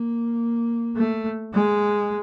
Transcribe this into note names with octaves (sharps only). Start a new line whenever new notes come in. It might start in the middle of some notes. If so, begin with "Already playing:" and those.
Already playing: A#3
A3
G#3